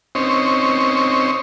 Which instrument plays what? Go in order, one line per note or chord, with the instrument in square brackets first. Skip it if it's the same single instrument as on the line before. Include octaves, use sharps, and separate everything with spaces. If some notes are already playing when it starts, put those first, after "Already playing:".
[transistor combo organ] C4 C#4 D#4 C5 C#5